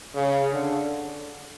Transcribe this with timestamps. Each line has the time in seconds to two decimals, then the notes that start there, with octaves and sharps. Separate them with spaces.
0.15 C#3
0.53 D3